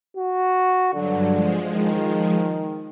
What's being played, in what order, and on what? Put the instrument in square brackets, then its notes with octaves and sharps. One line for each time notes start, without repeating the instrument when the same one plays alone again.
[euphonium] F#4
[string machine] G2 F#3 [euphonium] D3
[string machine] F3 G#3
[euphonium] D#3